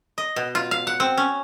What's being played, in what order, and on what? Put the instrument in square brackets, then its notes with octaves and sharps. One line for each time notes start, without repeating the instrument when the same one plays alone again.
[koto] D#5
B2
F4
F5
F#5
C4
C#4